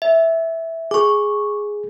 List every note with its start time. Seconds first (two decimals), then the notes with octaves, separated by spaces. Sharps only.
0.02 E5
0.91 G#4 C#6 D6